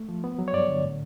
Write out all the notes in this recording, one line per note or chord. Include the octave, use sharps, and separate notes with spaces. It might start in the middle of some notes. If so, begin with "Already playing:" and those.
Already playing: A3
F3
B3
F#3
C#5
G2 D5
D3
A2